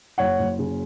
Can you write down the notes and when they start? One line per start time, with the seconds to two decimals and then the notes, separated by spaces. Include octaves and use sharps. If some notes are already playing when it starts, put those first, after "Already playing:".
0.18 F#1 C#5 F#5
0.39 F#1
0.59 C#3